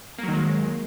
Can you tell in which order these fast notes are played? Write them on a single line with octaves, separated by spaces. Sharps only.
A#3 F#3 D#3 G#3